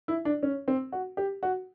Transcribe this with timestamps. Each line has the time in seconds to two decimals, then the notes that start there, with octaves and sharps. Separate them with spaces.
0.08 E4
0.25 D4
0.43 C#4
0.68 C4
0.92 F#4
1.17 G4
1.43 F#4